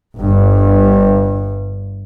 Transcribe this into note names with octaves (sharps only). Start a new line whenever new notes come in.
G1 G2